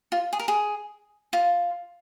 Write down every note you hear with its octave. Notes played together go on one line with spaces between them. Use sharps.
F4
G#4
A#4
G#4
F4